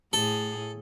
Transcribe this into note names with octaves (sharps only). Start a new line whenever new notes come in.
A2 G#4 A4